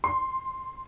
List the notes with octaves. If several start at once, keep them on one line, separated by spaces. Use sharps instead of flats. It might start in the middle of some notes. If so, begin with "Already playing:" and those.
C6